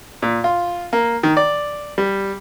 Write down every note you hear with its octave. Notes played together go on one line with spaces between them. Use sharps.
A#2
F4
A#3
D#3
D5
G3